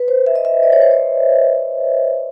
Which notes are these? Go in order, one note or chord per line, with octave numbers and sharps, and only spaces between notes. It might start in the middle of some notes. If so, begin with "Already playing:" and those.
Already playing: B4
C5
E5
D#5
E5
D5
C#5
C5
C#5